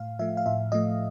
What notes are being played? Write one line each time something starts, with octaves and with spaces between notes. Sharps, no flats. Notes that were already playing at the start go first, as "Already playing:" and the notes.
Already playing: A2 F5
F3 A3 E5
F5
A2 E5
F3 A3 D#5